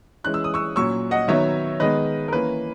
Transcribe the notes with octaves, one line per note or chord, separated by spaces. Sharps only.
E3 G#3 C#4 F#6
E6
D#6
C#6 E6
A#2 F#3 C#4 C#6 E6
D#5 F#5
D#3 F#3 B3 C#5 E5
D#3 G#3 B3 B4 D#5
A#4
E3 A#3 C#4 B4